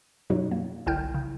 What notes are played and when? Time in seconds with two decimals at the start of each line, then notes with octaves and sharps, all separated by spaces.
0.30 F#2 B2 F#3 D#4
0.51 A#3
0.86 G1 C2 E4 G5 F6 G6
1.14 C#3